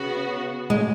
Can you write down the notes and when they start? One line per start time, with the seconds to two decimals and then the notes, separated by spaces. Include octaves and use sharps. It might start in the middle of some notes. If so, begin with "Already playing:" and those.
Already playing: C#3 B3 F#4
0.70 G#3